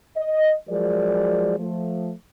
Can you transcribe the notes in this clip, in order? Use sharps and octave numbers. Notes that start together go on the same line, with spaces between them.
D#5
F3 F#3 G#3 G#4 A#4 D5
F3 A3